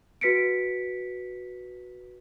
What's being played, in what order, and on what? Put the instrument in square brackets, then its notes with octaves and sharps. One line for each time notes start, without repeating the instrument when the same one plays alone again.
[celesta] F#4 B4 B6 C#7 D7